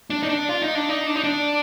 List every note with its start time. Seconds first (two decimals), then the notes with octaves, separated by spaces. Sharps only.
0.10 D4
0.23 D#4
0.29 D4
0.49 F4
0.62 D#4
0.75 D4
0.89 D#4
1.07 D4
1.16 D#4
1.24 D4